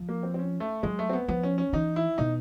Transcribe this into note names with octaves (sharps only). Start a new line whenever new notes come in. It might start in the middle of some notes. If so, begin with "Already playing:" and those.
Already playing: F3
A#3
C4
C4
C#4
A3
F#3 G#3
A3
C4
B3
F3 B3
C#4
C#4
E3 D#4
E4
B2 D#4